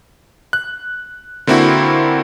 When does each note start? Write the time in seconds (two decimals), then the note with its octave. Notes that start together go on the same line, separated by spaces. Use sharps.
0.53 F#6
1.47 D3 A#3 C4 E4 F#4